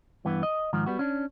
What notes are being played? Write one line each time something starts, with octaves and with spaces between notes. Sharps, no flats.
G2 E3 B3
D#5
G#2 D#3 F3
G3 B3 F#4
C#4 D4